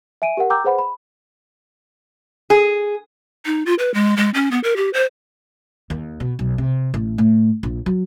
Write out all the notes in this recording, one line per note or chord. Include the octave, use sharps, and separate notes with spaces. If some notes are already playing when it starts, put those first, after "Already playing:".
E5 G#5 D7 D#7
G4 A#4 F#5
G5 A#5 D6 E6 G6
G#4 B4 C5 F#5 B5
B5
G#4
D#4
F4
B4
G#3
G#3
C#4
B3
A#4
G4
C5
D#2
B2
B1
C3
A1
A2
A#1
F#3